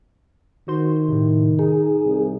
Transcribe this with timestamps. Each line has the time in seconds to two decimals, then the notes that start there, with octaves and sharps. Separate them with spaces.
0.68 D#3 F#4 C5 C6
1.08 A2 C3
1.59 D#4 G#4
2.05 C2